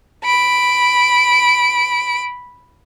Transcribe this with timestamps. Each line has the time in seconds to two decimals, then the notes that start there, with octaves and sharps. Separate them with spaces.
0.24 B5 D7